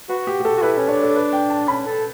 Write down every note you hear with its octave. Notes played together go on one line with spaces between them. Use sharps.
F#4 B4
G4
G4
A4
F#4
E4 B4
C#4
D4 C#5
A4
B4
G5
A5
C#4 B5
A4